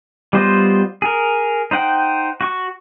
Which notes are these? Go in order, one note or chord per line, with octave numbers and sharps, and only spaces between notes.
G3 B3 F4 C5 D#5
G#4 A#4
D#4 C5 F#5 G5
F#4 C#6